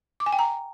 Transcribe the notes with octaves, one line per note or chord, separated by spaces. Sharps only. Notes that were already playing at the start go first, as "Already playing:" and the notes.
D6
G#5
G5
A#5